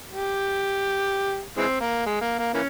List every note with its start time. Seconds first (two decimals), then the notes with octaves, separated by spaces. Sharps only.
0.11 G4
1.57 E3 G#3 C4
1.81 A#3
2.06 G#3
2.21 A#3
2.38 A#3
2.54 E3 A#3 C#4